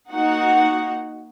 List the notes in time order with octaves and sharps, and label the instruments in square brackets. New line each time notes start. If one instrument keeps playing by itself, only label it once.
[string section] A#3 D#4 F#4 F#5